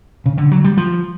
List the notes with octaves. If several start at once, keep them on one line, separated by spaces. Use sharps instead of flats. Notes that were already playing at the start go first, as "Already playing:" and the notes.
C#3
D3
F#3
G3
F3